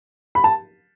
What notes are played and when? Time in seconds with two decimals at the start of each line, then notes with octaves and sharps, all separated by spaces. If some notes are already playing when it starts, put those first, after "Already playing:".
0.35 B5
0.44 A5